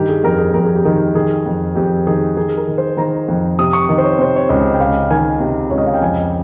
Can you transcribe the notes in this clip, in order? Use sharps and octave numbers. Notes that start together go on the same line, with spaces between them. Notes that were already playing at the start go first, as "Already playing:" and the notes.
Already playing: G2 D#3 G4
G#4
F2 A#4
G#4
F2 A#4
G#4
G4
D#3 G#4
D#3 G#4
F2
F2 G4
D#3 G#4
D#3 G#4
A#4
D#3
C5
D#3 A#5
F2
C3 D#6
C#6
D#3 D#5
C5
C#5
C3 C5
C#5
C#2 D#5
G5
C#2 F5
D#3 G#5
C3
C#2 C#5
D#5
F5
G5
F2 G#5